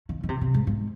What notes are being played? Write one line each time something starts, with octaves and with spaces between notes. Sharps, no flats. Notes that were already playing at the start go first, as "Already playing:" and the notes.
D#3
D#3
C3
C3
G#2
G#2